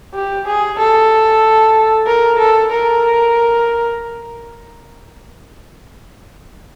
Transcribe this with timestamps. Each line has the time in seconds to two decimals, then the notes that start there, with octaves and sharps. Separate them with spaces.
0.15 G4
0.47 G#4
0.79 A4
2.07 A#4
2.39 A4
2.71 A#4